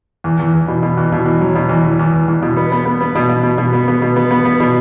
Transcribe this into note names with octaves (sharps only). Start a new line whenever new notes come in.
E2
E2
E2
B2
B2
E2
B2
E2
F#3
B2
E2
E2
E2
E2
E2
B2
B3
B3
B3
B3
B2
B2
B2
B2
B3
B3
B2
B3
B3
B3
B2